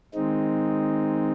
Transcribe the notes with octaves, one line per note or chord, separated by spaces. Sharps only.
D#3 G#3 C4 D#4